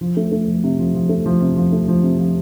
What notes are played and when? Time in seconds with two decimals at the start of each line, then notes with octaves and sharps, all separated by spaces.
0.01 F3
0.17 A3
0.32 A3
0.48 F3
0.64 C3
0.79 F3
0.94 F3
1.09 A3
1.26 F3
1.41 C3
1.57 F3
1.72 A3
1.88 F3
2.03 C3
2.18 F3